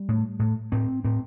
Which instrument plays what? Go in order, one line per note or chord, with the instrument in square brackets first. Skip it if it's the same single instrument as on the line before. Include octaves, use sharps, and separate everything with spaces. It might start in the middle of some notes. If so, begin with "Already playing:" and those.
Already playing: [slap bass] G3
A2
A2
A2 C4
A2 C4